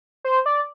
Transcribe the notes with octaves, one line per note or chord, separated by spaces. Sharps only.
C5
D5